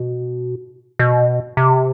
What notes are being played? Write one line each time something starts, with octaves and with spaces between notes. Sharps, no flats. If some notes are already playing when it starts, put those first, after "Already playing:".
Already playing: B2
B2
C3